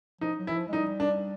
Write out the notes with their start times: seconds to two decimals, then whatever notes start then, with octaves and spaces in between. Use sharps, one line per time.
0.21 F3 D#4
0.38 F#3
0.47 E3 E4
0.56 F3
0.68 G#3
0.73 G3 D#4
1.00 D4